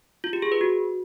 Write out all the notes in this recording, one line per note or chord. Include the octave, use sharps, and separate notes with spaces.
F4
G4
G#4
B4
F#4